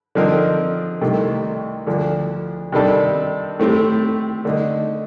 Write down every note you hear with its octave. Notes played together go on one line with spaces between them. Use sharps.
D3 F3 C4 D#4 A#4
C2 C3 D#3 A3
D2 D3 F3
C3 D#3 G3 D4 A4
A2 A3 C4 G4
D3 A3 D#4